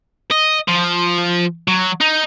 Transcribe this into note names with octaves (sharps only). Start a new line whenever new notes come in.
D#5
F3
F#3
D#4